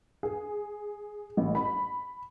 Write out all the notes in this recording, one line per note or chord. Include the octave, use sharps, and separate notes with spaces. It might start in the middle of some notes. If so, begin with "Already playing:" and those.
G#4
A1
B5